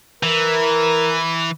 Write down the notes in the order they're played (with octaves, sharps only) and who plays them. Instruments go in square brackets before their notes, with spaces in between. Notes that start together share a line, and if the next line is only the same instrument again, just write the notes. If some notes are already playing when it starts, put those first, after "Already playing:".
[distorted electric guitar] E3 [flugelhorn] A#4